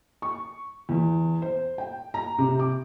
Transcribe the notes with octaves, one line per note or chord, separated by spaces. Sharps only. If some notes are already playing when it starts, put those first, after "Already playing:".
C#6
E2
C5
G5
A#5
C3
D6